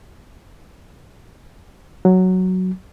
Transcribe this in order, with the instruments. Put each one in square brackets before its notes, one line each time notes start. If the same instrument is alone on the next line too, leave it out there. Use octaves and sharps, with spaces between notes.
[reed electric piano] F#3